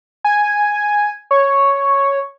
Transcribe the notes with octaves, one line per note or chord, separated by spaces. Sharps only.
G#5
C#5